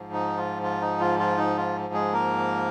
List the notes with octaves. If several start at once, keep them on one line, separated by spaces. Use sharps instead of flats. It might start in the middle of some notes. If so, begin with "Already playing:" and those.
Already playing: G#2 F3
D#4
F4
F4
D#4
F4
F4
D#4
F4
G#3 G#4
A#3 A#4